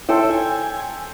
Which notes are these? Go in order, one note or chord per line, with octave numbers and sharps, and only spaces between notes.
E4 A4 C5 C#5 E5 G5
G#5